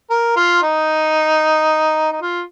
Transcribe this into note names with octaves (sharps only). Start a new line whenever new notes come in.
A#4
F4
D#4
D#4
F4